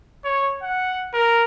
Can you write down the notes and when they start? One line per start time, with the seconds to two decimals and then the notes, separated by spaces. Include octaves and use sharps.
0.25 C#5
0.62 F#5
1.14 A#4